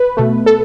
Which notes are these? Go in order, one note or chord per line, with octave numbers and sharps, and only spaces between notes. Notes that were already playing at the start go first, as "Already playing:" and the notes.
Already playing: B4
B2 A3
A4